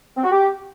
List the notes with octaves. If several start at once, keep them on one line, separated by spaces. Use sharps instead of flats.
C4
F#4
G4